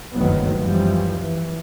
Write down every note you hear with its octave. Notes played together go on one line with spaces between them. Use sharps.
F#1 D2 G2 D#3 F#3 B3
F#2 E3 F3 G3
E3